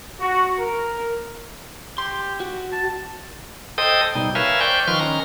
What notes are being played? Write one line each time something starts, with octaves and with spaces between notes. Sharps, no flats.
F#4
A#4
G4 C6
F#4
A5
A4 C5 D#5 G5 D#6
B2 G3 D#4
A#4 B4 C#5 E5 F5 G#5
C5 D5 G5 C#6 G6
D#3 F3 B4 C6 C#6 F6
D#3 C#4 A#5